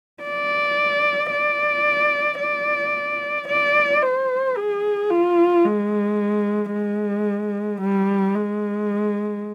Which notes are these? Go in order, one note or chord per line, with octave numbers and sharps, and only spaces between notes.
D5
D5
D5
D5
C5
G#4
F4
G#3
G#3
G3
G#3